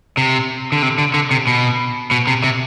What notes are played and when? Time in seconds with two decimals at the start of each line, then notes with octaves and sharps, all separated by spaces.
0.17 C3
0.72 D3
0.82 C3
0.98 D3
1.14 D3
1.31 C3
1.47 B2
2.11 B2
2.27 C3
2.44 C3